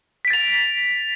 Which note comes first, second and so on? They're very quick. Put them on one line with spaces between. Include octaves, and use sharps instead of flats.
B6 D7 A6 F7